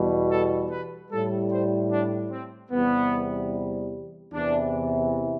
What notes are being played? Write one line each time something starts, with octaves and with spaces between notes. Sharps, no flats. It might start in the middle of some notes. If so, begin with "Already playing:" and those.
Already playing: E2 B2 G3
A4
B4
A2 G3 A4
C5
D4
C4
E2 C3 G3 B3
E2 C3 E3 D4